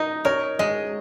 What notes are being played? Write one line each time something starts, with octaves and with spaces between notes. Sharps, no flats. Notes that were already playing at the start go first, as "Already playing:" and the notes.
Already playing: D#4 D#5
A#4 C#5
G#3 D#5